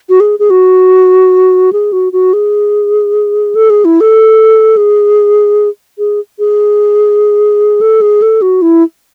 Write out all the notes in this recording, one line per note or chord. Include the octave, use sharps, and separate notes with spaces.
F#4
G#4
G#4
F#4
G#4
F#4
F#4
G#4
A4
G#4
E4
A4
G#4
G#4
G#4
A4
G#4
A4
F#4
E4